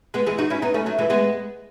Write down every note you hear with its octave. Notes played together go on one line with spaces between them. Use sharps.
G#3 B3
E3 G#3
D#4 F#4
C#4 E4
B3 D#4
A3 C#4
F#3 A3
E3 G#3
G#3 B3